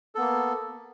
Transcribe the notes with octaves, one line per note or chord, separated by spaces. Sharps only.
A#3 B3 A4